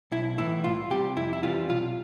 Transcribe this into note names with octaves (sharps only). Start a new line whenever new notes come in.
B1 E4
A2 E3 E4
C2 F4
C3 G3 G4
F2 E4
E4
C3 E3 G3 F4
B1 F4